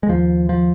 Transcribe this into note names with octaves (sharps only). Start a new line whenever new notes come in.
G#3
D#2 F3
F3